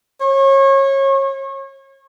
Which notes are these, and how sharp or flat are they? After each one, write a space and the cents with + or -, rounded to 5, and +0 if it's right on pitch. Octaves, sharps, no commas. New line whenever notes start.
C#5 -30